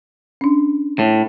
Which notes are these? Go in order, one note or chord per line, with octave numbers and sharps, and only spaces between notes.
C#4 D4
A2